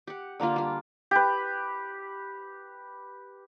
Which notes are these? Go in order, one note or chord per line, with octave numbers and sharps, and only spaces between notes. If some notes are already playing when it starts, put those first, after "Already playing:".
G4 F#5
D3 A#3 D4 F4
G3 F4
G4 B4